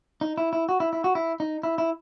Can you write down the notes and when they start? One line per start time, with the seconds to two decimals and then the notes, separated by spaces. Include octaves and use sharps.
0.21 D#4
0.38 E4
0.53 E4
0.69 F#4
0.80 E4
0.93 E4
1.04 F#4
1.15 E4
1.40 D#4
1.63 E4
1.78 E4